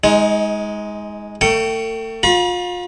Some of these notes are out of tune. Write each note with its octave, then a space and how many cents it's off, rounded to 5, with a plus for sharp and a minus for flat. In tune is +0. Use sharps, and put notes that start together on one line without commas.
G#3 +0 D#4 +30
A3 +35 G5 -25 C#6 +0
F4 +30 B5 -45